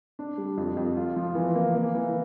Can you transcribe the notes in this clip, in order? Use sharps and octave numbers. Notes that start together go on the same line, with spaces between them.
D4
G3
F2
F2
F4
F3
E3
A#3
A#3
E3